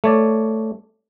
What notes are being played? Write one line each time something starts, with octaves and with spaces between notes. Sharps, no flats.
A3 C#5 D5